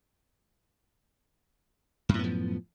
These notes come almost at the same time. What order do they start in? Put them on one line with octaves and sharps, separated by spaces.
F#2 A2 B3 F3